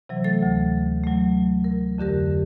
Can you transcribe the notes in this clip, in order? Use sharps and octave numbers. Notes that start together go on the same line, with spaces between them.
C3 E3 F#3
A3 A4 A6
D2
F#3 A3
A#4
F2 D3 G4 A#4